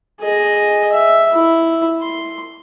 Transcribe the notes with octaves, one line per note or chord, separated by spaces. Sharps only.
G#4 D#5
E5
E4
C6